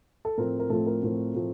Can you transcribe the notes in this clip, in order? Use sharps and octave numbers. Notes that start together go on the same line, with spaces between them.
A4
A2 F3 A3 C4 A#4
A#4
A2 F3 A3 C4 A4
A#4
A2 F3 A3 C4
A2 F3 A3 C4